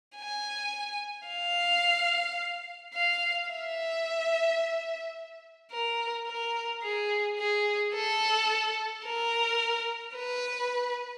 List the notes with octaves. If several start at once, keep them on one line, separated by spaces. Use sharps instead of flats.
G#5
F5
F5
E5
A#4
A#4
G#4
G#4
A4
A#4
B4